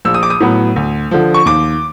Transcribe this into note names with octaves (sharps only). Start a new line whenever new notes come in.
A#1 E6
D#6
D6
D#6
A2 F#3 B3
D2
D3 F3
C#6
D#2 D6